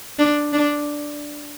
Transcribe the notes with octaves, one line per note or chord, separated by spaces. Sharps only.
D4
D4